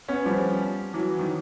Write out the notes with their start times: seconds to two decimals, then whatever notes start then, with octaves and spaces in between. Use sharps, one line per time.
0.08 B3 C#4
0.25 F3 G3
0.94 E3 F#3
1.19 D#3